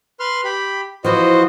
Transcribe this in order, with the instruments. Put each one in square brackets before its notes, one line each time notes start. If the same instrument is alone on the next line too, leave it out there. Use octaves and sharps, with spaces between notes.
[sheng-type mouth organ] B4 C6 F6
G4 B5
[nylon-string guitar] E3 F3 [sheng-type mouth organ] F#4 C5 D#5